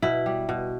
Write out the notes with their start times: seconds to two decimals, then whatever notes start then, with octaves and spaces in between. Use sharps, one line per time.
0.02 B2 E4
0.26 G3
0.49 B2